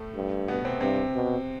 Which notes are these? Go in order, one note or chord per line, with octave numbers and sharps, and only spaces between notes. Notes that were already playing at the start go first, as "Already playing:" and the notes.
Already playing: A2 A3
G2
B2 B3
C3 C4
G2 C3 C4
B2